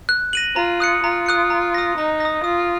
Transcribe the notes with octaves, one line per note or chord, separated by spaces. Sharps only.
F#6
A#6 D#7 F#7
F4 A#5
D#6 F#6 C#7
F4 A#5
D#6 F#6 C#7
A#5
D#6 A#6
D#4 A#5
D#6 A#6
F4 D#6